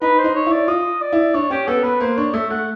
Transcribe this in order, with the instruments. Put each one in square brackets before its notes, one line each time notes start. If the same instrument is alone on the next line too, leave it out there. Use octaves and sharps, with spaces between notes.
[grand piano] D#4 [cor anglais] B4
[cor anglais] C5
[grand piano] D#4
[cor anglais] C#5
[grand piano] E4
[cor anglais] D5
[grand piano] F4 [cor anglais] D#5
[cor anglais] D5
[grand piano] E4
[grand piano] D4 [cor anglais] C#5
[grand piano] C#4 [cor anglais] G4
[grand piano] B3 [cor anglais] A4
[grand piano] B3 [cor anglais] B4
[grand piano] A#3 [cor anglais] C5
[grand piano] D4 [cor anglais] C#5
[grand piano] A3 [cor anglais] E5
[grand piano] A3 [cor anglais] F#5